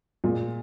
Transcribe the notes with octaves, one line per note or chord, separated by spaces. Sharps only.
A#2 G#3 F4